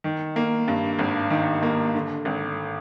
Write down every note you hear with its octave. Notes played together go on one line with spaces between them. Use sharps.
D#3
A#3
G2
G#1
D#3
A#3
D3
G#1